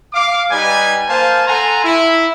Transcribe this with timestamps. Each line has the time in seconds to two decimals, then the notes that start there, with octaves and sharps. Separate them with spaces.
0.13 F5 D6
0.50 G3 D#4 G4 B4 G#5
1.08 A#3 C5 F5 G#5 A5
1.47 A4 F#5 G#5 A#5 C6
1.83 E4